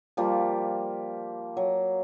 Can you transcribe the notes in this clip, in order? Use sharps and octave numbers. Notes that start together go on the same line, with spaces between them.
F3 G3 A#3 F4
F#3